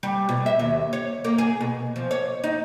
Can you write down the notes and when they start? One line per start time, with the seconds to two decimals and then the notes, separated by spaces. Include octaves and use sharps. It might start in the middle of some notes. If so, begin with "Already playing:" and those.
0.03 G3
0.29 B2
0.46 E5
0.59 D#2
0.93 C#5
1.25 A#3
1.38 G#4
1.61 B2
1.96 F3
2.11 C#5
2.44 D#4